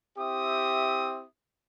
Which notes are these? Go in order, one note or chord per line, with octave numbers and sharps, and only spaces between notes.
C4 E4 G4 E5 D#6